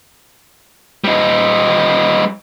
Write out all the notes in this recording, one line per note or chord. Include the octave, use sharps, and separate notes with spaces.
G3 D#4